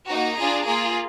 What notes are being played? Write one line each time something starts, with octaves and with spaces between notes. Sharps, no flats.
A#3 D#4 F#4 A#5
D4 F4 G#4
A#3 F4 G#4